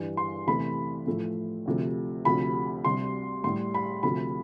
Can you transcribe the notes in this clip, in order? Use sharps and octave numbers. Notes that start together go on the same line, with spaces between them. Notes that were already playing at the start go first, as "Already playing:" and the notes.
Already playing: G2 E3 G3
C6
E2 C3 E3 A3 B5
A2 F3 A3
D2 C3 F3 A3
D2 C3 F3 A3 B5
C2 C3 G3 C6
A2 G3 C6
B5
D2 C3 F3 A3 B5